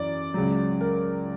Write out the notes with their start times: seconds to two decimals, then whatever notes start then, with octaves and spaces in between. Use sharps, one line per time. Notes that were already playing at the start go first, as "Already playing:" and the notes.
Already playing: F#2 E3 D5
0.34 C#2 C#3 F#3
0.81 A#4